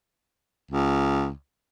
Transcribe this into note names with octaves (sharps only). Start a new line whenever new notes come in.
C#2